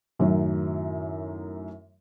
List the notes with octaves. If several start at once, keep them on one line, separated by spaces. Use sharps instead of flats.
F#2 A2 D#3 F#3